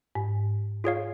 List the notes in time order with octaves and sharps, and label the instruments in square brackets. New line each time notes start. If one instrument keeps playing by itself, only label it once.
[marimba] G#2
[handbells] F4 G#4 C#5 F5